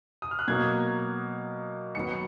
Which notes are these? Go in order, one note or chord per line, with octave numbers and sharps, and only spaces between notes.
D#6
F6
F#6
B2 F#3 A#3 G#6
D#3 F#3 B3 C#7
C#7